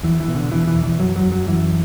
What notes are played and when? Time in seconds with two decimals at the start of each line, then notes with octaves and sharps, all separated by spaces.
0.03 E2 E3
0.20 E3
0.28 B2
0.36 D3
0.52 B2 E3
0.67 E3
0.75 E2
0.83 E3
0.99 F#2 F#3
1.16 F#3
1.23 F#2
1.32 F#3
1.47 F#2 E3